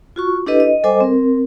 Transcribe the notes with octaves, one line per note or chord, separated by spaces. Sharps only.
F4 F#4 C#6
D4 E4 G4 A4 B4 D#5
D#5
G3 A4 C5 D#5 G#5 D6
C4 A#4